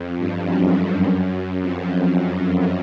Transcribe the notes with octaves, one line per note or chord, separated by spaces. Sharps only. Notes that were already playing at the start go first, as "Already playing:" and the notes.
Already playing: F2
G2
F#2
F2
F#2
F2